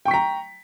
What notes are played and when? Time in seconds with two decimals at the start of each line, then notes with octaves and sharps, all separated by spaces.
0.05 G5
0.08 C#6
0.11 B6
0.14 A#5